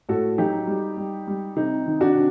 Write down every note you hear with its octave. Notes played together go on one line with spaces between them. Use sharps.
A2 F#4 A4
F#3 D#4 G4
G3
G3
G3
C3 D#4
D#3
D4 F#4
C3